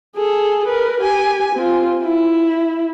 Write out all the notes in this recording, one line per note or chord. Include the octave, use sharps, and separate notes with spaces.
G#4 A4
A#4 B4
G4 G#5
C4 F4
E4